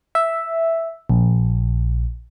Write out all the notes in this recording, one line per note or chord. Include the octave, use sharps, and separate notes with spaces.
E5
A#1